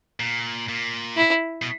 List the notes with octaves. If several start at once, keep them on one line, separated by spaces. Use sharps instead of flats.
A#2
A#2
E4
B2